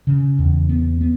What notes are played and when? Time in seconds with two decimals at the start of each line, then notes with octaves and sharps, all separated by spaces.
0.07 C#3
0.39 E2
0.69 B3
1.01 B3